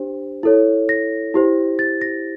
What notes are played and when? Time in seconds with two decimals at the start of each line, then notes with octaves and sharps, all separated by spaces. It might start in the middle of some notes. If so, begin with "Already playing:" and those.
Already playing: D4 G4 C5
0.43 E4 A4 C#5
0.89 A#6
1.34 E4 G4 C5
1.79 A6
2.01 A#6